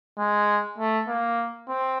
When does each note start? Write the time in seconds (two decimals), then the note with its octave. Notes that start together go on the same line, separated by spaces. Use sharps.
0.18 G#3
0.78 A3
1.08 A#3
1.68 C4